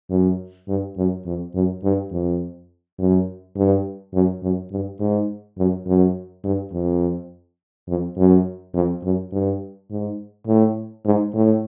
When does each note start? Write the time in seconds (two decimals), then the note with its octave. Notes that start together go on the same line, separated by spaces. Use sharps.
0.10 F#2
0.68 G2
0.97 F#2
1.26 F2
1.54 F#2
1.84 G2
2.12 F2
2.99 F#2
3.56 G2
4.14 F#2
4.42 F#2
4.71 G2
5.00 G#2
5.58 F#2
5.86 F#2
6.44 G2
6.73 F2
7.88 F2
8.17 F#2
8.74 F2
9.03 F#2
9.32 G2
9.90 G#2
10.47 A2
11.05 G#2
11.34 A2